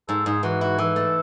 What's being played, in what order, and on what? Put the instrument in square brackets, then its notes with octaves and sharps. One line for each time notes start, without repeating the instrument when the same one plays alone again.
[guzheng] G#2 [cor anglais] A4
[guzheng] G#2 [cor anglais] G#4
[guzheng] E3 [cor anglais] F#4
[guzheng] E4 [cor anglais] F#4
[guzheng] E3 [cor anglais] A4
[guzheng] A3